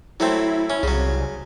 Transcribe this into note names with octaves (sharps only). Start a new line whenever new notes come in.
F#3 A3 C4 E4
C#4
C2 C#3 F#3